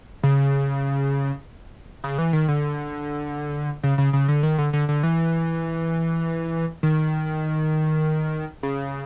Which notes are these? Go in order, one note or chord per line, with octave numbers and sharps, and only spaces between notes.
C#3
C#3
E3
D#3
D3
C#3
C#3
C#3
D3
D#3
D3
D3
D3
E3
D#3
C#3